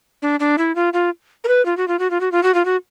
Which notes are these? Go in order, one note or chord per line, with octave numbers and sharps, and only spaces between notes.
D4
D4
E4
F4
F4
A#4
B4
F4
F#4
F4
F#4
F4
F#4
F4
F#4
F4
F#4